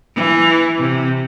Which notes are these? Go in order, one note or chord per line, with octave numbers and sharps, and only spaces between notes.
E3
C3